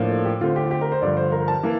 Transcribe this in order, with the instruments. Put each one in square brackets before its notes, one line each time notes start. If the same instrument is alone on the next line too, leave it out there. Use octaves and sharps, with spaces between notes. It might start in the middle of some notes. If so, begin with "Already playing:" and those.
Already playing: [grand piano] A2 F3 A#3 D4 F4
[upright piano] A4
G4
[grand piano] D3 A3 C4 [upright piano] F4
[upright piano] G4
F4
G4
A#4
C5
[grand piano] G2 D3 F3 [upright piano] D5
[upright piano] C5
A#4
A5
[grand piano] E3 A#3